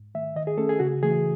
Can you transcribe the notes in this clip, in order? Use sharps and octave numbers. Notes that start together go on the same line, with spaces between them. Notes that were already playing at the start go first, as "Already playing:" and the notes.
Already playing: G#2
D#3 A3 E5
D#3 D#5
G#4
A3 C#4 A4
G#4
C#3 F#4
E3 A3 G#4